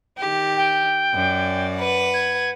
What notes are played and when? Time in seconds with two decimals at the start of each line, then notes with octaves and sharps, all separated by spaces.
0.18 D#3 G4
0.57 G5
1.14 F#2 D5
1.77 B4 F#5
2.14 G#6